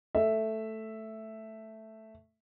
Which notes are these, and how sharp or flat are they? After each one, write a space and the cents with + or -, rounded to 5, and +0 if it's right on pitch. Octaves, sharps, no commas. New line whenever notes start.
A3 +0 E5 +0